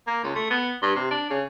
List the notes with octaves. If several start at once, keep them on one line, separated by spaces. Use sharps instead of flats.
A#3
C#2
A3
B3
G2
C3
D4
C#3